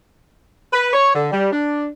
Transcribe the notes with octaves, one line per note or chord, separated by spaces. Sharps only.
B4
C#5
D3
G3
D4